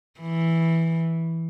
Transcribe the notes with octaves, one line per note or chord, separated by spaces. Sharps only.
E3